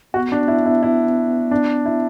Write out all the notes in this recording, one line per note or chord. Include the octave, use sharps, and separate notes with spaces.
B3 F#4
D4
E4
E4
E4
D4
E4